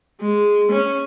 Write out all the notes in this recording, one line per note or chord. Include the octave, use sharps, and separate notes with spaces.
G#3
C#4